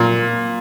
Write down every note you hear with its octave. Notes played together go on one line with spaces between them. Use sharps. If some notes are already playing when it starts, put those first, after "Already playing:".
Already playing: A#2